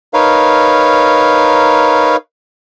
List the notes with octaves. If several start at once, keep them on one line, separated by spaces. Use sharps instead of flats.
D#4 A#4 B4 C#5 F5